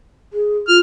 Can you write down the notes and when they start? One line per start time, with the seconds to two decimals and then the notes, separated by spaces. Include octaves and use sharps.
0.33 G#4
0.68 F4 F6